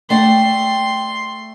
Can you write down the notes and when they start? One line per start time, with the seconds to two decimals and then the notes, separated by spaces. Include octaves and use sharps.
0.10 A3 D5 F#5 G5 C6